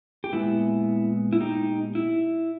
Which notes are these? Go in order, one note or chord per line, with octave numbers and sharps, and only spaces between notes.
G4
A#2 G#3 B3 E4
E4
D#4 G4
E4